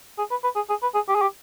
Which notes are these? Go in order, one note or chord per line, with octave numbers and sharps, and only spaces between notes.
G#4
B4
B4
G#4
G#4
B4
G#4
G4
G#4
G4